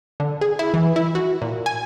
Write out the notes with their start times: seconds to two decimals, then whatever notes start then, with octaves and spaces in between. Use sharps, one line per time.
0.20 D3
0.41 G#4
0.59 E4
0.74 E3
0.96 E4
1.15 F#4
1.42 A#2
1.66 G#5